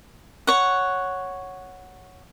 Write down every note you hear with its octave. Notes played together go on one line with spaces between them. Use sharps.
C#5 F#5